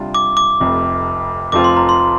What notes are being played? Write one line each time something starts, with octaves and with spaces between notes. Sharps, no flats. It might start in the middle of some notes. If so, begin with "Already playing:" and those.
Already playing: C3 G3 D4 F4
D6
D6
F1 F2 C3
F1 F2 F3 C4 F4 D6
C6
A#5
C6